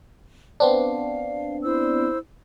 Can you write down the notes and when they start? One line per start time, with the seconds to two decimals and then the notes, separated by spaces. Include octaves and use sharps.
0.60 B3 C4 D4 F5
1.63 E4 C5 E6